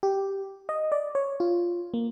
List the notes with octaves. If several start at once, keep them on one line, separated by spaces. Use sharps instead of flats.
G4
D#5
D5
C#5
F4
A#3